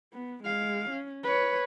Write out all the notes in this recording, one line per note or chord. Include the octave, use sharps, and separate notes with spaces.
B3
G#3 F5
C#4
B4 C#5